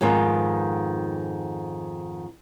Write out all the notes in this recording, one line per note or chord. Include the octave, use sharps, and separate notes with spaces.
F2 G#2 D#3 B3 C4 F4